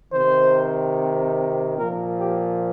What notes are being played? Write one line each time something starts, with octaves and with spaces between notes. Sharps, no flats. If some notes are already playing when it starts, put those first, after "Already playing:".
C3 D#3 C5
A#2 F3 A#4
G4